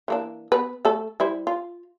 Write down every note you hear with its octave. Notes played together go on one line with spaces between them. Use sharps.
E3 A#3 D4
B3 B4
A3 A4
G3 E4 C5
F4